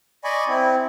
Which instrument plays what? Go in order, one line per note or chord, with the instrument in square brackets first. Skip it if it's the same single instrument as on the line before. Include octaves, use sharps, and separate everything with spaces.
[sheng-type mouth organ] D5 D#5 G#5 B5 C#6
C4 E4